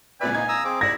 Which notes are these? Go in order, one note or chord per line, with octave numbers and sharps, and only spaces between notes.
C#2 A#2 B4 D5 E5 G#5
D#4 F5 G#6
A#5 D#6 E6
C4 G#4 D6
E4 D5 G#6 A#6